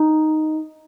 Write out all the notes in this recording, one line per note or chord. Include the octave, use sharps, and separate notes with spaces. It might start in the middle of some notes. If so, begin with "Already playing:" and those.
Already playing: D#4